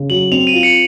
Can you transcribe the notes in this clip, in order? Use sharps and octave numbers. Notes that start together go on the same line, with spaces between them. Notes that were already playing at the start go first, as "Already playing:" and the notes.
Already playing: C#3
F#3 F#7
C4 F7
D#7
F4
C#7